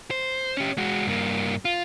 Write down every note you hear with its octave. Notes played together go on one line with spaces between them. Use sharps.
C5
C#4 G4
G#3 F#4
G2 A#3
F4